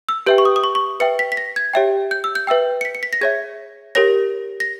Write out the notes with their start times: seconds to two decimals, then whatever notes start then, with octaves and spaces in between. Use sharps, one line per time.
0.09 E6
0.26 G4 B4 E5 G5 G6
0.38 C#6
0.45 D#6
0.56 D#6
0.64 C#6
0.75 C#6
1.00 B4 E5 G5 C#7
1.19 B6
1.32 B6
1.37 A#6
1.56 G#6
1.73 G4 C#5 E5 G5
2.11 G6
2.24 E6
2.35 G6
2.47 B4 E5 G5 E6
2.81 C#7
2.85 B6
2.95 C#7
3.03 B6
3.13 A#6
3.21 G#4 C#5 E5 G#6
3.95 G4 A#4 C#5 A#6
4.60 A#6